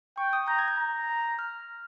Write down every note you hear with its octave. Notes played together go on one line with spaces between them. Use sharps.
G5 C#6
D#6
A#5 G6
G#6
G6
A#5
F6